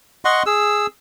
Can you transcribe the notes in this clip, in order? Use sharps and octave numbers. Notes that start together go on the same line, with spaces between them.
D#5 F#5 C6 C#6
G#4 E6